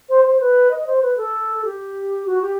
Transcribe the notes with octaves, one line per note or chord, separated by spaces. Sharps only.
C5
C5
B4
D#5
C5
B4
A4
G4
F#4
G4